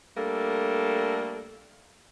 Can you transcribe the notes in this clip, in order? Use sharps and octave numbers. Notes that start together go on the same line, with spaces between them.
G3 A3 A#3 D4 A4